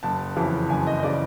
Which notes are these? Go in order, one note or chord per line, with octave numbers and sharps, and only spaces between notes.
F#1 A5
F2 C#3 E3
F#1 G#5
D#5
D#5
C#3 E3 D5